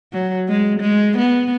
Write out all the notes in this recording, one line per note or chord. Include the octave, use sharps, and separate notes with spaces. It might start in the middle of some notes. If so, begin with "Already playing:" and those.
F#3
G#3
G#3
B3